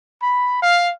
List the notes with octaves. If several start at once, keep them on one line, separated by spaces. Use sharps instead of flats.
B5
F5